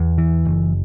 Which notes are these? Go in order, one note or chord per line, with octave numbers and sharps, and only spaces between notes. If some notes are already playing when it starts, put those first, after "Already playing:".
Already playing: E2
E3
F#1